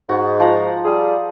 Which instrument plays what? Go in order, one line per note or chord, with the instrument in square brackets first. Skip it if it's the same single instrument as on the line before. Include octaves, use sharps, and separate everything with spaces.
[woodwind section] G#2 [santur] F#4
[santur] F3 F#5 A#5
[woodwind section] G3 F4 G#4